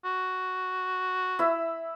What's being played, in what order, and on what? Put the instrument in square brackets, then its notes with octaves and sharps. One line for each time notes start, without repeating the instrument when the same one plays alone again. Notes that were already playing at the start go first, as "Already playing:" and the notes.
[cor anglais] F#4
[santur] E4 E5